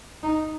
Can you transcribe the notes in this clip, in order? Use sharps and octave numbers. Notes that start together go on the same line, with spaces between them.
D#4